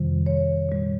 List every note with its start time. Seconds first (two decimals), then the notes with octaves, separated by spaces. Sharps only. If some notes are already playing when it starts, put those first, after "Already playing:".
Already playing: F2 C3 D#3 G3
0.26 C#5
0.69 A#2 G3